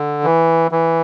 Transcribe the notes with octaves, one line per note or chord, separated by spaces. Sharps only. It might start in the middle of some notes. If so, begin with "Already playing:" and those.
Already playing: D3
E3
E3